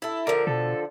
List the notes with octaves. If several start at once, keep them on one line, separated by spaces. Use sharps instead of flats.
E4 A4
D3 F3 A#4
B2 A4